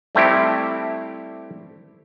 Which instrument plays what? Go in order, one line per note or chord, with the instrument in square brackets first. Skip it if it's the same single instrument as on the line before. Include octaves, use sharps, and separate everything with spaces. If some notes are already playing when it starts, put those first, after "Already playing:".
[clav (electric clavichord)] G3 A3 C4 E4 G4